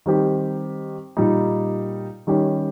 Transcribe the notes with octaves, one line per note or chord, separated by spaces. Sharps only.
D#3 G3 C4 G4
A#2 G3 A#3 D#4
D#3 G3 C#4 G4